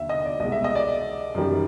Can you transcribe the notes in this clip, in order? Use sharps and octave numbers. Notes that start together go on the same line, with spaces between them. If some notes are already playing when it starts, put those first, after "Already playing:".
Already playing: D#2 D3 F#3 E5
D#5
D5
C2 B2 G#3 D#5
E5
D#5
D5
F#2 D#3 G3